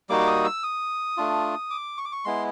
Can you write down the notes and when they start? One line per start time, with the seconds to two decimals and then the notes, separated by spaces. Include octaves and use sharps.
0.10 G3 A#3 D#4 F#4 D6
0.27 D#6
0.45 E6
0.63 D#6
1.17 A3 D4 F4
1.70 D6
1.98 C#6
2.05 D6
2.12 C#6
2.25 G#3 B3 E4 C6